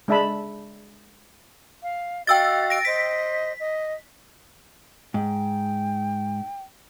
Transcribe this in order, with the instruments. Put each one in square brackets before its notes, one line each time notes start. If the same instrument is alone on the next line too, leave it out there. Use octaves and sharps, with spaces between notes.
[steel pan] G#3 D4 E5 A5 B5
[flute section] F5
[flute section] F#4 D#5 F5 [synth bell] G5 E6 A6
[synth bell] A#6 D7
[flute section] C5 D#5 [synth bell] B6
[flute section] D#5
[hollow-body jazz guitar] G#2 [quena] G5